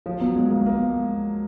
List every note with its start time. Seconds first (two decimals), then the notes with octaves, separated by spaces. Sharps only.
0.06 F3 F4
0.20 F#3 B3
0.36 G#3 B3
0.51 G#3 A#3
0.66 A#3 B3